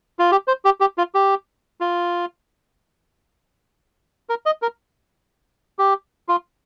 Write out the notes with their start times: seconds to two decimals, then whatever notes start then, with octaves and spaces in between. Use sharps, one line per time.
0.19 F4
0.32 G4
0.48 C5
0.65 G4
0.81 G4
0.98 F4
1.15 G4
1.81 F4
4.30 A#4
4.46 D#5
4.62 A#4
5.79 G4
6.29 F4